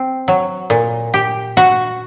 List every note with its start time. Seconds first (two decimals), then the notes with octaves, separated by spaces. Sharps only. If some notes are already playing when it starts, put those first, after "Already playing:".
Already playing: C4
0.28 F#3
0.70 A#2
1.14 G4
1.57 F#4